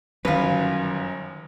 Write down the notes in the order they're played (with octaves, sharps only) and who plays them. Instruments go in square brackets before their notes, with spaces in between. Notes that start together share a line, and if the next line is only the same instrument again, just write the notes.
[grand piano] G1 F#2 [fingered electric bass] D#3 F#3 [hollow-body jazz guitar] B4 F5